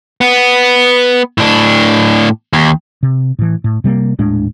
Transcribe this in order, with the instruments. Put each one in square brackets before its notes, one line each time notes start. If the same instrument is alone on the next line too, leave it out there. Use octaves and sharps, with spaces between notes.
[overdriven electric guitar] B3
A2 D4
D#2
[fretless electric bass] C3
A2 E3
A2
C3 G3 G#3 A#3
D#1 A2 G#3 D4